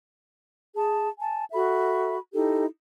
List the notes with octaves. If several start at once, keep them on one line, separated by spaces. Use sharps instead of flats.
G#4 A5
G#5 A5
F#4 A4 E5 B5
D#4 E4 G4 A4